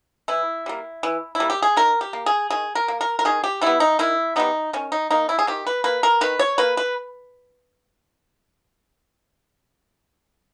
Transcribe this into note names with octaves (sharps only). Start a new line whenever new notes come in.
E3 E4
G3 A#3
E3
E4
G3 A#3
G4
G#4
D#3 A#4
G4
A#3
G#4
D#3 G#4
A#4
A#3
A#4
A#4
D#3 G#4
G4
G3 B3 E4
D#4
D#3 E4
G3 B3 D#4
D#3 C#4
D#4
A#3 D#4
E4
G#4
D#3 G4
B4
A#3 B4
A#4
D#3 B4
C#5
A#3 B4
B4